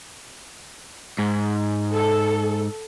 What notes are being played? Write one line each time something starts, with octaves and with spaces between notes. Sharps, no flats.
G#2
A4